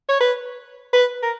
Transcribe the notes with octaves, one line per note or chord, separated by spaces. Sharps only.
C#5
B4
B4
A#4